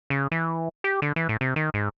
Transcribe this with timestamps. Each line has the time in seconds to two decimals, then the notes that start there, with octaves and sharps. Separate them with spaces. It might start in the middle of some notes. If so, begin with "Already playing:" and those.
0.10 C#3
0.32 E3
0.84 G4
1.02 D3
1.16 E3
1.29 A2
1.41 C3
1.56 D#3
1.74 G#2